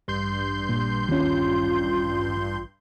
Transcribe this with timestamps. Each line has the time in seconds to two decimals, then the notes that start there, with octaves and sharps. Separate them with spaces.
0.08 A1 G2 C6 G6
0.69 A#2
1.09 D#2 C#4 F4